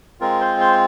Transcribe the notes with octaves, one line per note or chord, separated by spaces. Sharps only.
G#3 C4 F4 A#4
C5
C5